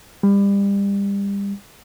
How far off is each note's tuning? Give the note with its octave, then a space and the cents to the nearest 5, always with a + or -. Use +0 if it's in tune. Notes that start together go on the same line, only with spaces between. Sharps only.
G3 +30